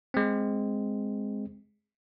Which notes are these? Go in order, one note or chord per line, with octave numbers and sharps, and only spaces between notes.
G#3 C4